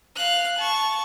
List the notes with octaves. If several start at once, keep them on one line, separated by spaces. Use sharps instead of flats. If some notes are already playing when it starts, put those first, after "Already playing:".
F5 F#6
A5 C#6